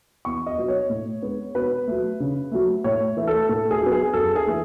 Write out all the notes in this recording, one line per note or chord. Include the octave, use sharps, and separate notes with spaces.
E2 C#6
D#5
B2 F#3 B3
C#5
A2
G#3 B3
B2 B4
F#3 A3
C#3
F#3 A3
A2 C#5
E3 A3
A4
A2 A4
G#4
F#3 B3
G#4
F#2 A4
G#4
E3 A3